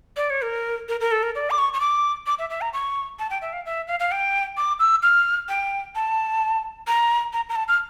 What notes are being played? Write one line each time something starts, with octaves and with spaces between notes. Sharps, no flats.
D5
C#5
A#4
A#4
A#4
A4
A#4
D5
D6
C#6
C#6
D6
D6
E5
E5
A#5
C#6
A5
G5
E5
F5
E5
F5
F5
G5
D6
E6
F6
G5
A5
A#5
A#5
A#5
A5
F6